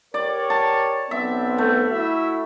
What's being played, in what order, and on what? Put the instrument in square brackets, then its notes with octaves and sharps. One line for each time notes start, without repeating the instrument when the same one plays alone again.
[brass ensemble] G4 A#4 C#5 [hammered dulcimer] D5
[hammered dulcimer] A5
[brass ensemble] B1 B3 C4 [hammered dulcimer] E5
[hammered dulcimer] A3
[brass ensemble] E4 F#4 E5